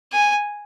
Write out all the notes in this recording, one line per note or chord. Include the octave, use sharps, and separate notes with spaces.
G#5